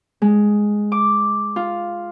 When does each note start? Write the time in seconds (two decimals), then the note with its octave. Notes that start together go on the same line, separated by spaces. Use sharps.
0.22 G#3
0.92 D6
1.56 F4